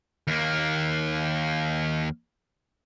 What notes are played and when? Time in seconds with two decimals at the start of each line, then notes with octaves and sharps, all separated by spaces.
0.27 D#2 A#3